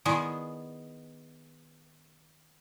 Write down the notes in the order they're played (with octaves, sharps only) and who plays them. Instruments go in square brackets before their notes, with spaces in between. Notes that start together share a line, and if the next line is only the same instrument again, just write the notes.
[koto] D#3 B3 G#4 [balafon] E4 D5 G#5